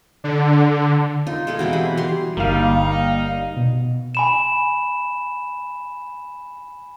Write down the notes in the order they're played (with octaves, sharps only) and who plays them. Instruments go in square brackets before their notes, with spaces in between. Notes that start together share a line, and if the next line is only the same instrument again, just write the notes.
[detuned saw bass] D3
[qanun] D#4 F4
G#3 E4 F4 A4
B2 E3 G3 C4
G#4 F#5 B5
G3 C6
[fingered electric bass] G1 D3 [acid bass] G3 [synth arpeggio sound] A#3 F5 [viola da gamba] D#4
[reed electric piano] B2
[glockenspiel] G#5 B5 E7